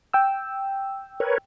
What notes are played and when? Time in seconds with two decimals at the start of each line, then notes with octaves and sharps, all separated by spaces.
0.13 G5 E6
1.20 A#4 B4 C#5